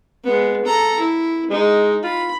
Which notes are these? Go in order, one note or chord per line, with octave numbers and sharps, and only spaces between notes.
G#3 B3
A4 A#5
E4
G#3 D#4
F4 B5